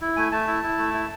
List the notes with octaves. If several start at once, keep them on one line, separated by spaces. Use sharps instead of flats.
E4
A3 G#5
A3 A5
E4
E4
A3
E4